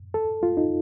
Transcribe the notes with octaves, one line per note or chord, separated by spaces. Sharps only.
A4
F4
D#4